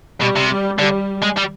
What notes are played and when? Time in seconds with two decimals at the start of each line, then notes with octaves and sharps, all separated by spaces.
0.21 B2 G3
0.36 C3
0.49 G3
0.79 D3 G3
1.22 G#3
1.37 G3